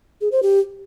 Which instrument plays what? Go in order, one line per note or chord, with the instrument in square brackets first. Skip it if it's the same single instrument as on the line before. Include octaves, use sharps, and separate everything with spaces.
[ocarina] G#4
C5
G4